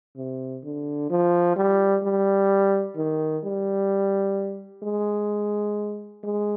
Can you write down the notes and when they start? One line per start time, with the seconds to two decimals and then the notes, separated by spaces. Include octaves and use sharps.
0.16 C3
0.64 D3
1.10 F3
1.56 G3
2.04 G3
2.96 D#3
3.44 G3
4.83 G#3
6.24 G#3